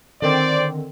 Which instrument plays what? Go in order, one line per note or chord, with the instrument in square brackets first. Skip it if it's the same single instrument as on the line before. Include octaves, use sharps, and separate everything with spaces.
[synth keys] D3 D#3 C4 [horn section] C5 D5